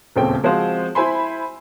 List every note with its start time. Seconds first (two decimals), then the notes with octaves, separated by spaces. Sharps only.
0.16 D#1 E2 C#3 A3 C4 G5
0.44 F3 G#3 C4 F#4 C5 F5
0.95 E4 C5 G#5 B5 C6